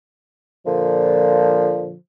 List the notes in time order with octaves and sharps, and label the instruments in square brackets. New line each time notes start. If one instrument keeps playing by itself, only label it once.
[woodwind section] A#2 D3 F3